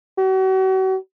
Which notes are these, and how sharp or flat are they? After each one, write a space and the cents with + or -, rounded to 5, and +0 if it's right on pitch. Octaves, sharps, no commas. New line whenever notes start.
F#4 +40